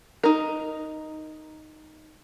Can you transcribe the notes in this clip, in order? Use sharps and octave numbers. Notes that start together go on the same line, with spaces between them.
D#4 A#4